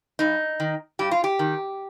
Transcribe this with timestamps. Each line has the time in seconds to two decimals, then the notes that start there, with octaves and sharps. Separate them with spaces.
0.19 G2 D#4
0.60 D#3
0.99 G2 G4
1.11 F4
1.24 G4
1.39 D#3